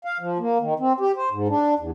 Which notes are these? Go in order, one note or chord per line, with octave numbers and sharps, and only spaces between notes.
F5
F3
A#3
D#3
C4
G4
C5
G#2
D4
E2